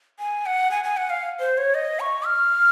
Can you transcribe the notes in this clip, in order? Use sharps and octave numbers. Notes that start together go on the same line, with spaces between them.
G#5
F#5
G#5
G#5
F#5
F5
C5
C#5
D#5
C#6
F6